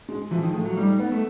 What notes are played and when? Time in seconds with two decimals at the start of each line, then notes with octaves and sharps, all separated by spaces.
0.09 G#3
0.31 E3 F3
0.43 D#3
0.54 A2
0.65 F#3
0.77 G3 D#4
0.99 B3
1.12 A3